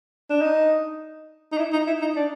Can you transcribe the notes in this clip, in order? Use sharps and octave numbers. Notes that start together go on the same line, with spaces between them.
D4
D#4
D#4
E4
D#4
E4
D#4
D4